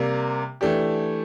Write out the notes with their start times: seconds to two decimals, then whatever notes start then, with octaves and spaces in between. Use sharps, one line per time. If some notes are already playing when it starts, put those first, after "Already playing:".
Already playing: C3 G3 A#3
0.61 E3 A3 D4 G4